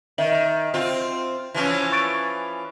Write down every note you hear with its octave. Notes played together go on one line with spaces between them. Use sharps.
D#3 D#5 E5 F#7
C4 F4
E3 F3 C#4
C#6 A6 D7